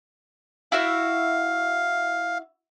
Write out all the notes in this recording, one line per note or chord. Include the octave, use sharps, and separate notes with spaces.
E4 F#4 E5 F5